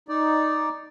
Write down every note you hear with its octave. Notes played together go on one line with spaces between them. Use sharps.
D#4 D5